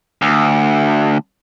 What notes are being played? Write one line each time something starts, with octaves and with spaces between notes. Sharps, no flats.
D2